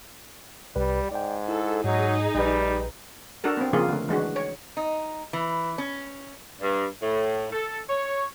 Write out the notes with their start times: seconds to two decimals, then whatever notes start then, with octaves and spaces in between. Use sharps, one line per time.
0.76 C2 G3 B4
1.11 G#2 D5 G5
1.49 E4 A4
1.84 G#2 F#3 D#4 G#4
2.35 A#1 G3 B4
3.44 D4 F#4 A4 A#4
3.57 B3 C4
3.73 C#3 F3 A#3 F4 G#4
3.89 D3 A3
4.09 E3 G#3 D4 F#4
4.36 C#5
4.77 D#4
5.33 E3
5.78 C#4
6.61 G2
7.02 A2
7.52 A4
7.89 C#5